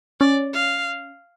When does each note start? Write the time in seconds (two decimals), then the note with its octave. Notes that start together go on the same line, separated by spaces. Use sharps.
0.20 C#4 D5
0.53 F5